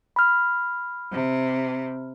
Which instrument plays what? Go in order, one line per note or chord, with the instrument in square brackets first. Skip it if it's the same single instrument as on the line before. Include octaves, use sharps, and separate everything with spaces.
[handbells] B5 F6
[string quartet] C3